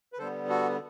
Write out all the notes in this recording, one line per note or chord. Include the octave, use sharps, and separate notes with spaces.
B4
D3 G3 B3 A4 C5
F#4 A4